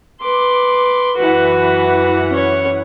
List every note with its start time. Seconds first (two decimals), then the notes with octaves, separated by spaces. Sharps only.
0.22 B4 C6 D6
1.18 F#2 E3 F#4 B4 F#5
2.29 C#4 C#5